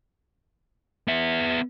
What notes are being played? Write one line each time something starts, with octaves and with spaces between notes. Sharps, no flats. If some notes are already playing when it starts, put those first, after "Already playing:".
B3 E5